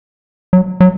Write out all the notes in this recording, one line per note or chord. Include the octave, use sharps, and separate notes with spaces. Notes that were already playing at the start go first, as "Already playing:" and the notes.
F#3
F#3